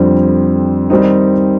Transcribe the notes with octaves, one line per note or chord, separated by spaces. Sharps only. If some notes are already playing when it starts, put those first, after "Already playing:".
Already playing: F2 D3 G3 C4
D#3 G3 C4 D#4